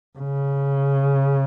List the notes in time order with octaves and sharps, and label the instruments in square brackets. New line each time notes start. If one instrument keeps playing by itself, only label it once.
[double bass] C#3